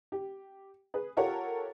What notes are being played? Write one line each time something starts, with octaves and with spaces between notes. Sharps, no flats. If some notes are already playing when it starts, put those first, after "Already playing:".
G4
G#4 B4
F4 G4 A4 A#4 C#5 F#5